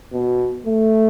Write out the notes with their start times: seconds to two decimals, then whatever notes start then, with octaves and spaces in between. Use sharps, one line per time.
0.13 B2
0.66 A3